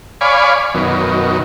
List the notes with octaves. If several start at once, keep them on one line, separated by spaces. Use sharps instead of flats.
C#5 D5 F5 G#5 B5
F#2 B2 D#3